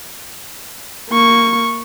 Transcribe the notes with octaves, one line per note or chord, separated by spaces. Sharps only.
A#3 C#6